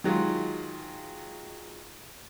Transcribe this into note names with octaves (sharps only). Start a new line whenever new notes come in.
D#3 F#3 G#3 F4